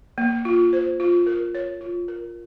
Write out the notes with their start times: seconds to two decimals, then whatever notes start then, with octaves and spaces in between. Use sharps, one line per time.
0.18 A#3
0.45 F4
0.73 C5
1.00 F4
1.27 A#4
1.55 C#5
1.81 F4
2.08 A#4